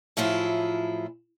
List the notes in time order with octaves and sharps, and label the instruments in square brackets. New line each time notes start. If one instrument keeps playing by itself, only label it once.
[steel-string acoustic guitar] A2 F3 F#3 E4 F4 G#4